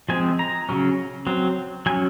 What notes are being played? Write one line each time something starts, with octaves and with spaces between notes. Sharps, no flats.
F3 G#3 C4 G#5
A#5
C#3 F#3 C#4
F#3 C4
F#3 C#4 G#5